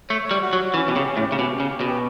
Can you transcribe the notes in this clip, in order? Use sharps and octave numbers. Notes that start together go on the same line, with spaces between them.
A3 C#5
C#5
G3
F#4
F#3
F#4
E3 C#4
B2 G4
C#3
C#4
A2
G4
C#3
B2 G4
C#3 C#4
G4
B2
G4